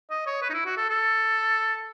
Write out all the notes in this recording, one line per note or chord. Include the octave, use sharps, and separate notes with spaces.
D#5
C#5
B4
D#4
E4
F#4
A4
A4